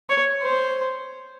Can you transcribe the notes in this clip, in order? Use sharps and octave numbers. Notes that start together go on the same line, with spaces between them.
C#5
C5